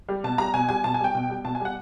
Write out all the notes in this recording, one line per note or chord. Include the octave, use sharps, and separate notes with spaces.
G3
B2 A5
G3 A#5
B2 G#5
G3 G#5
B2 A5
G#5
G3 G5
B2
G3
B2 A5
G#5
G3 F#5